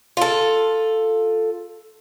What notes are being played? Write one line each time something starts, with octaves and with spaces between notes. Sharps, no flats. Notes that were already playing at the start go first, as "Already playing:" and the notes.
F4 A4